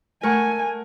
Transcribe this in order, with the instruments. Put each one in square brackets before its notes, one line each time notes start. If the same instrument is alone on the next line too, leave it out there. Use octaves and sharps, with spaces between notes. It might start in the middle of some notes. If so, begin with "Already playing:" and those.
[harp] A3 C#6 [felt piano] A#4 F#5 [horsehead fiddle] G#5